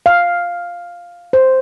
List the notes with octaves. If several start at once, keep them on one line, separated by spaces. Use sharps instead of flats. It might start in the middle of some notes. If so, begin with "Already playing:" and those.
F5
C5